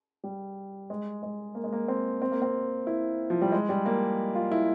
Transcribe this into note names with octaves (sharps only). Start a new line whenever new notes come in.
G3
G#3
G#3
A#3
G#3
A#3
C4
C4
A#3
C4
E4
F3
G3
G#3
G3
A#3
F4
E4